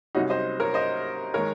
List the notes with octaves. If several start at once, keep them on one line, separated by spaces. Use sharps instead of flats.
C2 C3 F#3 C#4 D#4 F#4
C5 D#5
A#4 C#5
C5 D#5
D#3 G#3 A#4 C#5